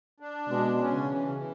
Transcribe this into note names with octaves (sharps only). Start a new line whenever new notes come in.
D4
B2 G#3
C#4
C#3
E3
E3